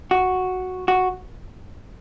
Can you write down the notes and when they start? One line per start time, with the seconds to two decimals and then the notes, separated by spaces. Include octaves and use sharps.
0.11 F#4
0.88 F#4